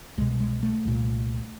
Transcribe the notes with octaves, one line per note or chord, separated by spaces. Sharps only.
C2 B2 G#3
G#3
A3
C2 A#2